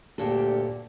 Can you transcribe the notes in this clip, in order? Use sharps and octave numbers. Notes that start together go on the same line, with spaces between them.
G1 D2 A#2 G4 A4